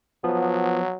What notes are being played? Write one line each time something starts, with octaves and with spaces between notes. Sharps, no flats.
F3 F#3 B3